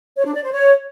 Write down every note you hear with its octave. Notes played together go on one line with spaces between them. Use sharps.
C#5
D4
D5
C5
C#5